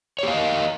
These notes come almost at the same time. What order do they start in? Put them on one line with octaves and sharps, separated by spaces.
C#5 G4 F5 D#5